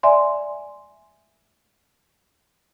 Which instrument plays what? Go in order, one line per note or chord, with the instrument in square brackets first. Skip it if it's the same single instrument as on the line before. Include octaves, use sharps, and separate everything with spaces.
[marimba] D5 E5 G#5 C6